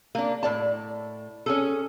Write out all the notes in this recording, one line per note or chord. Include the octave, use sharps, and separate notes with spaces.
A#3 D4
A2 D5 A5
C#4 G#4 A4